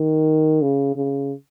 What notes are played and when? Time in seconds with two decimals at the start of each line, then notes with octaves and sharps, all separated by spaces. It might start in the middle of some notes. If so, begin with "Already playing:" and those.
Already playing: D#3
0.61 C#3
0.96 C#3